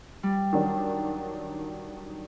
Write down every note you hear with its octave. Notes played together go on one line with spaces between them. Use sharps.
G3
D#3 F#3 D4